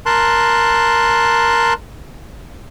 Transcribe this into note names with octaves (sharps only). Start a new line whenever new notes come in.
A#4 A5 C6 F#6